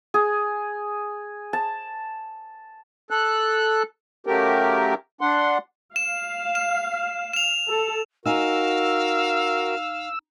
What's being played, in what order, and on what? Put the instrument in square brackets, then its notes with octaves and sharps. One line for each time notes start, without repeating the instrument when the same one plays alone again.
[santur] G#4
A5
[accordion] A4 F#6
C#3 F#3 A3 G4 A#4
D4 F#5 C6
[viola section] F5 [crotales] E7
[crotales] E7
E7 F7
[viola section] A4
[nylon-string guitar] D#4 G#5 [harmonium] F#4 A#4 [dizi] F5 [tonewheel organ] E6